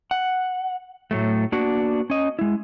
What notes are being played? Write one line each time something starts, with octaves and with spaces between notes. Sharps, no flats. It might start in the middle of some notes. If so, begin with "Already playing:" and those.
F#5
A2 F#3 A3
A#3 B3 D4 F#4
C#4 D#5
G#3 E4